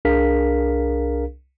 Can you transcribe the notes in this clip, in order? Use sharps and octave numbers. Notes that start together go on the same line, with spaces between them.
C2 D4 G#4 A#4 F5 B6